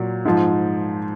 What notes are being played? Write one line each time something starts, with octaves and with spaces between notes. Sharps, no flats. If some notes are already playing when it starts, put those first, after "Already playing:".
Already playing: A#2 F#3
G#2 F3